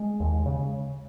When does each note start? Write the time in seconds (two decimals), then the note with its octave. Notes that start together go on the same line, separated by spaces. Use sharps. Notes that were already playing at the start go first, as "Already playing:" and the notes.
Already playing: G#3
0.20 D#2
0.46 C#3